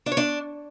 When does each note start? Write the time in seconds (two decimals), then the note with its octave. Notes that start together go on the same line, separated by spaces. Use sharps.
0.06 D4
0.12 C#5
0.17 D4